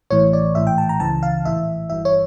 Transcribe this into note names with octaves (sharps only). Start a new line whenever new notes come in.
A1 A2 E3 C#5
D5
A#1 A2 E3 E5
G5
A5
A#5
C#2 C#3 E3 A5
F5
A#1 A2 E3 E5
G1 G2 E3 E5
C#5